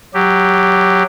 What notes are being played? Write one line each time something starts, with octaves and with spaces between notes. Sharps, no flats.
F#3 G4